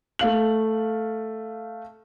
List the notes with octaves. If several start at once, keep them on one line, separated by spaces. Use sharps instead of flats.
A3 F5 F#7